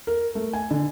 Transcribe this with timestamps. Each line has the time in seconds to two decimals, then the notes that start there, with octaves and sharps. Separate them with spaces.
0.07 A#4
0.35 A3
0.53 G#5
0.71 D3